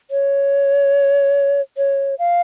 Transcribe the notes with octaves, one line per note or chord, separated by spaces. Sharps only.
C#5
C#5
F5